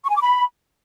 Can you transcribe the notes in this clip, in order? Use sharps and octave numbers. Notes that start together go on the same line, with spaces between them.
C#6
G#5
D6
B5